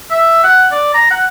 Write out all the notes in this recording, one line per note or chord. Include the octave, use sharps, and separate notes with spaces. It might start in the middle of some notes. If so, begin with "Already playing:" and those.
E5
F#5
D5
A#5
F#5